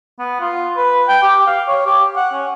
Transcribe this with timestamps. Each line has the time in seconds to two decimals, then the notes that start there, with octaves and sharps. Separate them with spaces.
0.19 B3
0.40 F4
0.77 B4
1.08 G5
1.23 G4
1.47 F5
1.68 C#5
1.86 G4
2.16 F#5
2.33 C#4